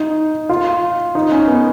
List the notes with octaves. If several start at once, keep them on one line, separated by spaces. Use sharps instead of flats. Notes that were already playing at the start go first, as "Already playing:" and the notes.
Already playing: D#4
F4
D#4
C#4
B3